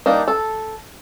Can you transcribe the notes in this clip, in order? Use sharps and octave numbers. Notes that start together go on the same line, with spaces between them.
G3 A#3 D4 D#4
A4